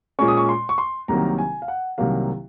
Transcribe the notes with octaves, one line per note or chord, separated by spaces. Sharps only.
A#2 G#3 C#4 C#6
D#6
C#6
C6
C#6
C6
C2 C3 D#3 F#3 A#3 A#5
G#5
F5
F#5
C2 C3 D#3 F#3 A#3 F5